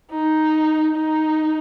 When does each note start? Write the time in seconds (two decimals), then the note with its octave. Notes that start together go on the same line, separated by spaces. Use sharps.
0.11 D#4
0.95 D#4